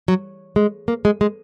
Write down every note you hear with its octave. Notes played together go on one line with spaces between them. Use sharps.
F#3
G#3
A#3
G#3
G#3